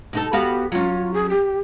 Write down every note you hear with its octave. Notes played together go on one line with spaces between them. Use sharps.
B2 D#4 A4
B3 F#4 G4 F5
F#3 C#4 F4
G#4
G4